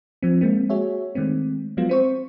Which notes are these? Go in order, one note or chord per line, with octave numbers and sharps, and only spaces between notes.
F3 C4
G#3 A#3 C4
F#4 G#4 C#5 E5
D#3 G#3 A3 C4
F3 F#3 G#3 B3 F4
C4 C5 C#6